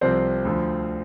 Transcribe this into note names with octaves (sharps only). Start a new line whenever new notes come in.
C2 C3 F3 C4 C5
D2 D3 F3